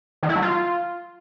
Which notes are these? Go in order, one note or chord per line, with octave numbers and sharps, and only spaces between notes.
D#3
E4
F#3
F4